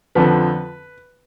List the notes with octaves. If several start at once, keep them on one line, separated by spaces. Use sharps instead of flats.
F2 D3 F3 B4